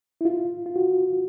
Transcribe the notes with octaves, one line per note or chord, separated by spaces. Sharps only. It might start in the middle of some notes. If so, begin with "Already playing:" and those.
E4
F4
F4
F#4